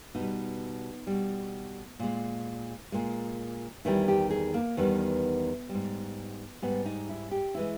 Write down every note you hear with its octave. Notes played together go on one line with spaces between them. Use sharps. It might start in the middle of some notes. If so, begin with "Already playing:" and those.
B2 D#4
G3
B2 G3
A#2 G#3
A#2 G#3
E2 D#3 G3 E4
G4
G#4
A#3
E2 D#3 G3 B3
G3
G#2
G#2 G3 B3
D#4
E4
G4
E3 G#3 E4